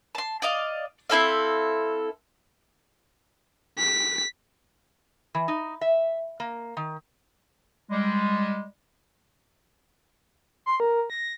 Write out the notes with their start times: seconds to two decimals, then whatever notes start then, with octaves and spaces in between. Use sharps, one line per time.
0.15 A5 C6
0.42 D5 D#5 F5
1.10 C4 E4 A4 F5
3.78 B6
5.35 E3
5.48 D#4
5.81 E5
6.40 A#3
6.77 D#3
7.90 G3 G#3
10.66 C6
10.80 A#4
11.10 A#6